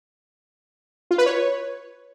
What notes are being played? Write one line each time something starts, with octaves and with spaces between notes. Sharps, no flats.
F4
B4
C#5